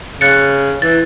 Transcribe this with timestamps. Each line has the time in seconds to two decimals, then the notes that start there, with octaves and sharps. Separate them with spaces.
0.21 C#3 F#6 A6 C#7
0.82 E3 A6